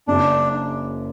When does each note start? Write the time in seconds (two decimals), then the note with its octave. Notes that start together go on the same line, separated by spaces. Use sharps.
0.07 F#1 F#2 C#3 D4